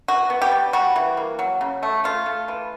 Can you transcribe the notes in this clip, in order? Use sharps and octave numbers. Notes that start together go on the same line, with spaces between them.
E3 F#4
B3
G4
G3
G3 F#4
E3
A#3
F#3
C#3
A3
A3 F4
A3
E3